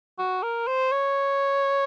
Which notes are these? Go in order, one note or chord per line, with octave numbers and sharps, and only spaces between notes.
F#4
A#4
C5
C#5